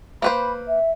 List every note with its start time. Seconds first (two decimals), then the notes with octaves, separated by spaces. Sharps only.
0.22 A#3 B4 C5 B5
0.67 E5